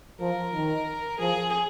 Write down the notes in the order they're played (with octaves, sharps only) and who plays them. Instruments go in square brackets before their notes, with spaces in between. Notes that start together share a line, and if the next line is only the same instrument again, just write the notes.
[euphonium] F3 [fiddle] A#4
[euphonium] D#3
[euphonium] F3 [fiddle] G#4